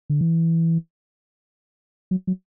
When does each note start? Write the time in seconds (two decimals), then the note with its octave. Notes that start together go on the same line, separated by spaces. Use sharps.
0.10 D3
0.21 E3
2.11 F#3
2.27 F#3